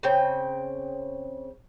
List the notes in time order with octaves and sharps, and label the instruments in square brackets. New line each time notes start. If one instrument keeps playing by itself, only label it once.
[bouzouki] C#3 C4 G5